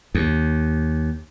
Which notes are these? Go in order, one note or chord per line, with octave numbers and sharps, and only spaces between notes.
D#2